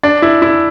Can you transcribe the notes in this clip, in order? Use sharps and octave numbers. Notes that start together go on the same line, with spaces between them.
D4
E4
E4